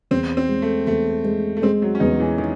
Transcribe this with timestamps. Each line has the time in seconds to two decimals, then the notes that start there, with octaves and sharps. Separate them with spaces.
0.11 E2 C4
0.37 C4
0.48 G#3
0.62 A3
0.87 E2 A3
1.24 G#3
1.57 A3
1.62 G#3 C4
1.82 F#3
1.95 C#4
2.00 E2 D#4
2.20 E3
2.38 D#3